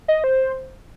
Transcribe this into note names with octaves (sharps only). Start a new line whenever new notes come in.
D#5
C5